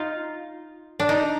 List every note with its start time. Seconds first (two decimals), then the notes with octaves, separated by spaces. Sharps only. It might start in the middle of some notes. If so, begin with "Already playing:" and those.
Already playing: D#4 F4
1.00 D4
1.09 D#4